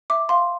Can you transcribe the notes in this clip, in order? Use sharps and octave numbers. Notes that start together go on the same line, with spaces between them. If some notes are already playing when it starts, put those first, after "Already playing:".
E5 D6
F5 C6